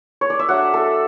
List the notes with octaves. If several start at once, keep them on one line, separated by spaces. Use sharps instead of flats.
C#5
D5
E5
F#3 A3 D4 F#5
A4